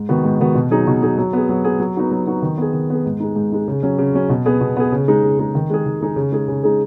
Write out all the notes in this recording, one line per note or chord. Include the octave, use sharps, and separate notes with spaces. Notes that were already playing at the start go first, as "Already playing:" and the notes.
Already playing: G#2
D#3 B3 F#4
G#2
D#3 B3 F#4
B2
F#3 D#4 G#4
B2
F#3 D#4 G#4
F#3
B3 G#4
F#3
B3 G#4
F#3
B3 D#4 F#4
F#3
B3 D#4 F#4
D#3
B3 G#4
D#3
B3 G#4
G#2
G#3 D#4
G#2
G#3 D#4
C#3
F#3 C#4
C#3
F#3 C#4
B2
B3 G#4
B2
B3 G#4
C#3
G#3 D#4
C#3
G#3 D#4
D#3
G#3 D#4 G#4
D#3
G#3 D#4 G#4
C#3
G#3 D#4 G#4
C#3
G#3 D#4 G#4